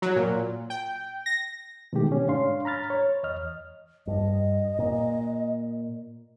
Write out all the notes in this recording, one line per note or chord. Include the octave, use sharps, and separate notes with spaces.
F#3
A#2
G5
A#6
B2 D3 D#3 G#3 A3 G4
C#4
G#2 D4 C#5 F5 C6
A#5 B5 F6 A6
C#5
E2 D#5 F6
G2 D#5
A#2